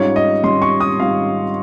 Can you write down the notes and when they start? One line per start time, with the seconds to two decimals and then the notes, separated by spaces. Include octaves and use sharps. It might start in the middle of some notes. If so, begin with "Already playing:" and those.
Already playing: G#2 G3 C#4 F4 C#5
0.16 D#5
0.44 G#2 G3 C#4 F4 C6
0.62 C#6
0.80 D#6
1.00 G#2 G3 C#4 F4 F5